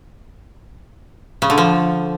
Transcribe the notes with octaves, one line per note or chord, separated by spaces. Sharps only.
C#3
D3
F3